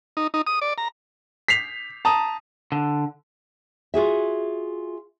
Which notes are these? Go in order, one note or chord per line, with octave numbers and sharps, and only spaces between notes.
D#4
D#4
D#6
D5
A#5
B6 C7 F7
A5 A#5 D#6
D3
F4 F#4 G#4 E5